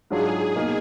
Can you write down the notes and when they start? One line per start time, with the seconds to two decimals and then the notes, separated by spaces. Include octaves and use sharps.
0.11 G#2 F#3 D4 F4 G#4
0.56 B2 A#3 D#4